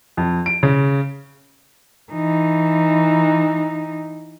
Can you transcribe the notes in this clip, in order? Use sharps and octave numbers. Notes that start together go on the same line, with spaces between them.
F2
D7
C#3
E3 D#4